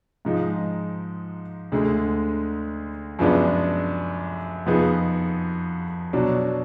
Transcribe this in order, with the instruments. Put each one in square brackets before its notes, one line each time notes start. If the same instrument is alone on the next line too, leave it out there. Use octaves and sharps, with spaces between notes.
[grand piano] G#2 F3 G#3 D#4
D2 D3 G#3
F#2 F3 G#3 B3 D4
F2 F3 B3 D#4 G#4
B2 F#3 D4